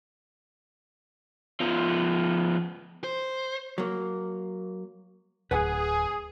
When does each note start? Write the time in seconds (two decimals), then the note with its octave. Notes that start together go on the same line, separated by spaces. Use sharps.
1.60 F3 B3
3.04 C5
3.78 F#3 A#3
5.51 D1 G#4 B4 F#5 G#5